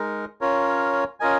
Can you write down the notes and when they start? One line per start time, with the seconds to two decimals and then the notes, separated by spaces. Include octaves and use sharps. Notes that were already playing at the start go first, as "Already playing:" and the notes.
Already playing: G#3 D#4 A#4
0.41 C#4 F4 A#4 C#5
1.20 C#4 F4 A#4 D#5 G#5